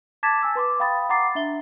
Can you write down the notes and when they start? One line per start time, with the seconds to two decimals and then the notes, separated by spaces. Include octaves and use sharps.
0.23 A5 D6 G#6 A6 B6 E7
0.43 G#5 E6
0.55 B4 C6 D6
0.80 F5 G5 B5 D#6 A6
1.09 F#5 A#5 C6 D6 A6 C7
1.35 D4 E5 G7